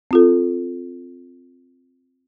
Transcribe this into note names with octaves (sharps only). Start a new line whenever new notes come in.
C4 F4 A4